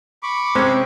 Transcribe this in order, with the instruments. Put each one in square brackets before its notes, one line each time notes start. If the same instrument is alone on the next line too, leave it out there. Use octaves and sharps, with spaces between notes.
[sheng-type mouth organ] B5 C#6 D6
[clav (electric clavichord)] C3 G#3 C#4 [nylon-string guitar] C4 C#5 [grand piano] C5